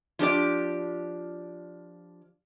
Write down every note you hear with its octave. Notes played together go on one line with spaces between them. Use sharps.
F3 D4 G4 D5